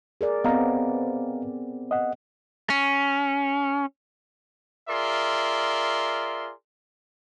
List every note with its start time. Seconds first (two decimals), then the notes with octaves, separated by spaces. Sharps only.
0.21 G#4 A#4 D5
0.44 B3 C4 D#5 F5 A#5
1.91 D#5 F#5
2.70 C#4
4.89 F4 G#4 A#4 D5 E5 C6